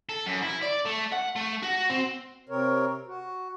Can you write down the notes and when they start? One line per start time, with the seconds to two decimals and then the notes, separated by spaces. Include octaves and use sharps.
0.09 A4
0.27 F#2
0.43 E4
0.62 D5
0.85 A3
1.12 F#5
1.36 A3
1.63 F#4
1.90 C4
2.49 C3 C4 A#4 C#5
3.07 F#4